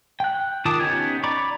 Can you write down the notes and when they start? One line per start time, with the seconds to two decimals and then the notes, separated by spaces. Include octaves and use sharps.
0.20 G5 F#6
0.65 D#3 F4 A5 D6 D#6
0.80 B3 C#4 D#4 G4 G#5
1.24 D5 A#5 B5 C#6 D6